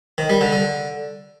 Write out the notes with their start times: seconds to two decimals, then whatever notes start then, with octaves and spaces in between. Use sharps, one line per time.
0.18 D#3
0.30 G3
0.41 D3
0.52 D3